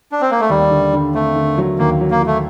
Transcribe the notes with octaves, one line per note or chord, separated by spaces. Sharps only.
D4
C4
A#3
A3
D#2 G3
D3
D3
A3 C4
D3
F#3
D#2 A#3
F#3
A#3
F#3 A3